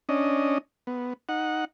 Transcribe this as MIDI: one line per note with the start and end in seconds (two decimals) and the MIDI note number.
0.09 0.58 61
0.09 0.58 62
0.09 0.58 75
0.87 1.13 59
1.29 1.65 63
1.29 1.65 78